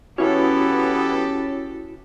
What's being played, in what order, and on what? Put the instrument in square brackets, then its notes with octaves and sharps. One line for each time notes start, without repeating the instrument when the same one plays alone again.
[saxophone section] E3 B3 [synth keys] C#4 [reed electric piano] E4 F#4 [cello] G4 A4